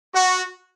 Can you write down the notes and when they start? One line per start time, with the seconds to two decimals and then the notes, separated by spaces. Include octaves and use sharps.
0.14 F#4